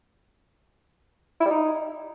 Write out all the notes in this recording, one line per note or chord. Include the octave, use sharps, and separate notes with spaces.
E4
G3
D#4